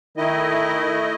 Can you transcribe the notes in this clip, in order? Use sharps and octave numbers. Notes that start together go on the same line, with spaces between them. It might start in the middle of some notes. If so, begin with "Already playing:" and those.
D#3 A3 E4 D#5